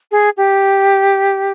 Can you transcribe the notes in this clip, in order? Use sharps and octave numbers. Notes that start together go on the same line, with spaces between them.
G#4
G4